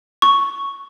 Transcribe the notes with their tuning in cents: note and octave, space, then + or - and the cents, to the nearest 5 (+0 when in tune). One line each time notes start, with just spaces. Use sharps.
C#6 +5